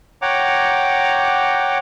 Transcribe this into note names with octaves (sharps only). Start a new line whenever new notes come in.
C#5 F#5 G5 A#5 D6